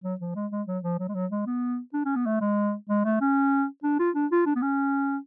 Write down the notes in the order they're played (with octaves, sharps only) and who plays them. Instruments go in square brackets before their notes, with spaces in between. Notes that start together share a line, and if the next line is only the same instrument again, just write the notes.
[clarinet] F#3
F3
G#3
G#3
F#3
F3
F#3
G#3
F#3
G#3
B3
D4
C#4
B3
A3
G#3
G#3
A3
C#4
D4
F4
D4
F4
D4
B3
C#4